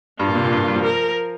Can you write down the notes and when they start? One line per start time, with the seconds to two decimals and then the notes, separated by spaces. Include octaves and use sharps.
0.20 G2 F4
0.28 A#2
0.35 C3
0.44 A#2
0.52 G2
0.59 A#2
0.68 G3
0.76 F3
0.83 A#4